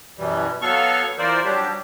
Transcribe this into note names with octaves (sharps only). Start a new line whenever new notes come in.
F#2 B2 E3 G3
F#3 B3 A4 F5 C#6
E3 F4 A#4 C5 D5
F#3 G3 D4 G4